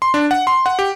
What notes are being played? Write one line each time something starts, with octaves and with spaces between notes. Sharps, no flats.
C6
D4
F#5
C6
F#5
G4